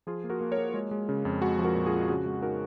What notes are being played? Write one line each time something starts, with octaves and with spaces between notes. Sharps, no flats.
F3 F4 G#4
A#3
F#4 A#4
A#3
A#4 C#5
A#3
G#3
G#3
C#3
F2
G#3 F#4
F3
F#4 A#4
A#2
F4 G#4
F3
C#3 F#4
G#3
D#4 F#4 A#4